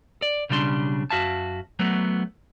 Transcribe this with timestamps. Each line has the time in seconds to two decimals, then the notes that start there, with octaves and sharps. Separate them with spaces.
0.22 D5
0.49 B1 C#3 G3 D4 C6
1.10 F#2 F#4 E5 F5 A5
1.79 F#3 A3 B3